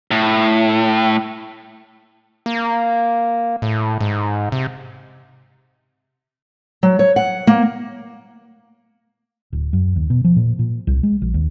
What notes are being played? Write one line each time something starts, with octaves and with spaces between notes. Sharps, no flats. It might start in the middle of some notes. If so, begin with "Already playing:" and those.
A2
A#3
A2
G#2
C3
F#3
C#5
F#5
A#3
D1
F#2
D#2
B2
F3
A#2
A#2
C2
G#3
A#1
D#2